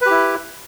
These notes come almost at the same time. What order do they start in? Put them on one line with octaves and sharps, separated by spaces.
B4 G4 E4